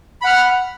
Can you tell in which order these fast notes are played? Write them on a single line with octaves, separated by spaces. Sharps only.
B5 F#5 F6